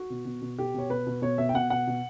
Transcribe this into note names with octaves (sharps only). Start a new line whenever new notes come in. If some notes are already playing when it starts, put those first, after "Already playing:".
Already playing: F#4
B2
B2
B2
B2 G4
B2 C#5
B2 B4
B2
B2 C#5
B2 E5
G5
B2 F#5
B2 F#5
B2